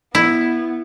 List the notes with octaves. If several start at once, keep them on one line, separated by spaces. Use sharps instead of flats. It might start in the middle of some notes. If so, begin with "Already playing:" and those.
B3 E4